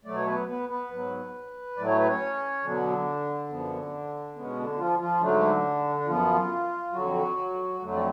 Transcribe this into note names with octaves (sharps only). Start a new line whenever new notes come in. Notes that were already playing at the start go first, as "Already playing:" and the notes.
B2 F#3 A3 D5
C#5
B3 B4
B3 B4
B3 B4
G#2 F#3 B3
A2 F#3 A3 D5
C#5
B4
C#4 C#5
B2 D3 F#3 B3 D4
F#2 F3 B3
B2 G#3 B3 C#4
D3 D4
F3 F4
F3 F4
G#2 D3 F#3 A3 D4
D4
F#2 F3 B3 F4
F2 D3 F#3 F#4
F2 D3 F#3 A3
D5